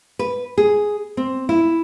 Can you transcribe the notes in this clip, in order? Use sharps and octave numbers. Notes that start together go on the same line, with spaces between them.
B4
G#4
C4
E4